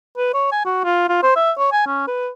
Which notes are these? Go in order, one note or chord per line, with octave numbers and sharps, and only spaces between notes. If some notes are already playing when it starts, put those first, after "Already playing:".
B4
C#5
G#5
F#4
F4
F4
C5
E5
C#5
G#5
C#4
B4